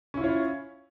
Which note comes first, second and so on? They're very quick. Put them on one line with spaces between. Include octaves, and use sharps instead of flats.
C#4 E4 F4 C#5